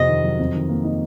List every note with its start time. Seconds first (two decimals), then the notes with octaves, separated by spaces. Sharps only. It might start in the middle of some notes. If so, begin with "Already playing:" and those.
Already playing: F2 C3 D#5
0.08 D#3
0.24 F#3
0.39 F2
0.55 D#3
0.69 A#3
0.84 D#4